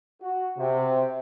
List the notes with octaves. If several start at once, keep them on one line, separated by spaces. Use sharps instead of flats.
F#4
C3